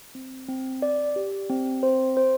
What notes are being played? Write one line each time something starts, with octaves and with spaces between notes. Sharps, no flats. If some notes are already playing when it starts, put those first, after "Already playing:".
C4
C4
D5
G4
C4
C5
C5